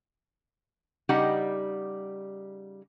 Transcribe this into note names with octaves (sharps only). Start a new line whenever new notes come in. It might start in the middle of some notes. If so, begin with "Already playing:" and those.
C#3 G3 D#4 G4 D#5 F#5